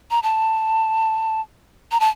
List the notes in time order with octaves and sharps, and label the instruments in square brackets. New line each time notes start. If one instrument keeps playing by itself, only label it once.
[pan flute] A#5
A5
A#5
A5